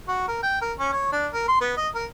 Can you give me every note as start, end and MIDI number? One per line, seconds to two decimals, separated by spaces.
0.08 0.24 66
0.28 0.42 70
0.42 0.60 79
0.61 0.73 70
0.79 0.90 61
0.93 1.08 73
1.12 1.28 62
1.32 1.45 70
1.48 1.58 84
1.61 1.76 59
1.76 1.88 75
1.95 2.05 70